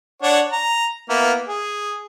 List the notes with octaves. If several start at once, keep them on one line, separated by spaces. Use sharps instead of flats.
D4 C#5 F#5
A#5
A#3 B3 E4
G#4